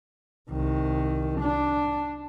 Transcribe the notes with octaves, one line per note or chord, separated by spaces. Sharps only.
C2 D#3
D4